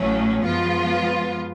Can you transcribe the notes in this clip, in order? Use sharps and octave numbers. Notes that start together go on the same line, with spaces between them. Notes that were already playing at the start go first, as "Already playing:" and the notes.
Already playing: A1 A2 F#3 A3 C#4
F#2 F3 G#3 B3 F4